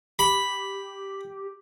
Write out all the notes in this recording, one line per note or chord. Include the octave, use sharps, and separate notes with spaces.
G4 B5